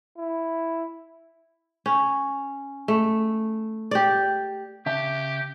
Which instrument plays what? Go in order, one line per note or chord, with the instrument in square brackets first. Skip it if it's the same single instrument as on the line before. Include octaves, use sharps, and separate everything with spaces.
[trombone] E4
[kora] C#4
A3
G4 D5
[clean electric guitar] C#3 E5 A5 [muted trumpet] G4